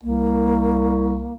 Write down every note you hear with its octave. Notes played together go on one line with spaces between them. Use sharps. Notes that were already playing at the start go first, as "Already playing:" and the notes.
C2 A#3